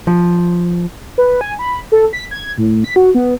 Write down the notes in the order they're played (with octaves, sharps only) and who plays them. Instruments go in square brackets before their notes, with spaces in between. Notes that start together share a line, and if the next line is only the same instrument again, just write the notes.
[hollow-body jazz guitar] F3
[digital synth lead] B4
G#5
B5
A4
B6
G#6
A2
B6
F#4
B3